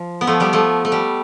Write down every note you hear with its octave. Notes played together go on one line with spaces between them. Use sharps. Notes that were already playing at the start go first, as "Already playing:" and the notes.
Already playing: F3
B3
F3 A3
G3 B3
F3 A3
A3
G3